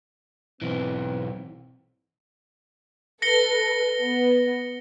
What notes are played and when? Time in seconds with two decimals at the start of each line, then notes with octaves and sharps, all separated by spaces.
0.62 B1 E3 C4
3.22 A4 B4 A#6 C#7 G7
4.02 B3